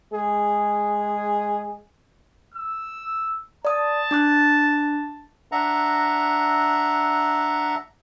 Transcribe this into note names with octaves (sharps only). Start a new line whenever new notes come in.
G#3 G#4
E6
D5 A5 D#6
D4 D6 F#6
D4 E5 F#5 A#5